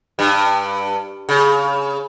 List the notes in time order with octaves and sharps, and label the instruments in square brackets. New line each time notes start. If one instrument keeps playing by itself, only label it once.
[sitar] G2
C#3